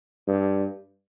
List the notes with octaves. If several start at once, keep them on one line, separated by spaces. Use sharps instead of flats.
G2